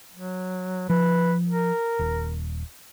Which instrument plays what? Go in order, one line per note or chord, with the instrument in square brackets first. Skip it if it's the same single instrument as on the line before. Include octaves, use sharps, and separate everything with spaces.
[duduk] F#3
[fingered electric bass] F3 [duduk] B4
[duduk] A#4
[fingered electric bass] D#1